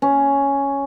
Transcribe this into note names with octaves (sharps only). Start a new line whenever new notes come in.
C#4